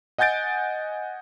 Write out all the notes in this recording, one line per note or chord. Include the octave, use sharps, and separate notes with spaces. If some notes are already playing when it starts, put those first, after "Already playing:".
D#5 F#5 G#5 G6 A6 D7